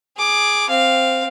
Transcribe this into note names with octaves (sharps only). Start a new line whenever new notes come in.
G#4 D6
C4 F5